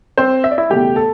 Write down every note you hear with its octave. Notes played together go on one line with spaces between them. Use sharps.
C4 C5
E5
D5
E4 E5
F#1 E2 B2 A3 G4 G5
A4 A5